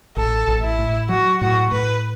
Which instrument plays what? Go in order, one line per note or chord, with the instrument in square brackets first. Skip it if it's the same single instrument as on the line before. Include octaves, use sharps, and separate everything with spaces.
[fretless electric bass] A1 [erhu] A4
[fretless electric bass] A1
[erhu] E4
[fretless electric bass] A2
[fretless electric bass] F#3 [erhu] F#4
[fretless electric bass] A2 [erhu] F#4
[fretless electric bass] A2 [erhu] B4